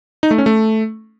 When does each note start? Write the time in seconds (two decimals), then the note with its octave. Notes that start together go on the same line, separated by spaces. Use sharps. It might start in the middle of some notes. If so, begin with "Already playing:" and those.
0.23 D#4
0.31 A3
0.38 C#4
0.46 A3